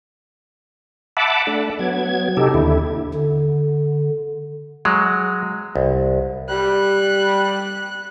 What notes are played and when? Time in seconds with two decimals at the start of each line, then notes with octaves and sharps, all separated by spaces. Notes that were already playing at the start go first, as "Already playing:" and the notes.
1.17 E5 F#5 A5 B5 D6
1.47 A3 D4
1.79 F#3 B3 G#6
2.37 C3 D#4 G4 A4
2.54 D#2 D3 E4
3.14 D3
4.85 F#3 G#3
5.76 C2
6.49 G3 F#6